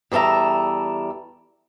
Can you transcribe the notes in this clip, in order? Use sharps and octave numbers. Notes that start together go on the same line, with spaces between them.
E2 G3 A4 E5 A#5